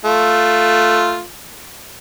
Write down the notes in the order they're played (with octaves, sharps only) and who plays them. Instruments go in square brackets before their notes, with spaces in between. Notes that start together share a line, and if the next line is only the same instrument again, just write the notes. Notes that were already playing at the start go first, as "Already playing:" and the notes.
[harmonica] A3 F4